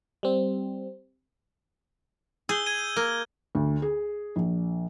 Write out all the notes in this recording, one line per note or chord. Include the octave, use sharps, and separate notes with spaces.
G3 C4
G#4 E6 G6 G7
G#6 D#7
A#3
D2
G#4
A#1